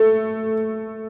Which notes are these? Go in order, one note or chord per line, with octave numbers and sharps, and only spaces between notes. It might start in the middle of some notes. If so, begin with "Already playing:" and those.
Already playing: A3